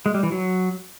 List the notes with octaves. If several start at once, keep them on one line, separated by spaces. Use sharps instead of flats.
G#3
G3
E3
F#3